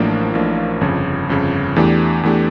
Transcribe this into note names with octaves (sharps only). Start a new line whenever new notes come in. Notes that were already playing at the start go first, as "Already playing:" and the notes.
Already playing: A1 A2 F3 A#3 D4
A1 A2 F3 A#3 D4
G1 F2 C#3
G1 F2 C#3
E2 E3 A3 D4 G4
E2 E3 A3 D4 G4